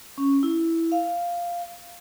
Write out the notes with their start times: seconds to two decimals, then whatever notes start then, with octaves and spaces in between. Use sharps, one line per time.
0.18 C#4
0.43 E4
0.92 F5